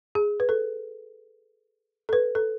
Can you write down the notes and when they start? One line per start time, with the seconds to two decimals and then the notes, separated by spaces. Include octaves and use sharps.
0.15 G#4
0.40 B4
0.49 A4
2.09 A4
2.13 B4
2.35 A4